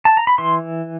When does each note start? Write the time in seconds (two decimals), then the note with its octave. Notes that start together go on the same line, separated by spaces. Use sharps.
0.05 A5
0.17 A#5
0.27 B5
0.38 E3 C6